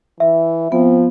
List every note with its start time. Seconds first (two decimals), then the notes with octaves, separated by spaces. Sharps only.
0.20 E3 E5
0.72 F3 B3 C4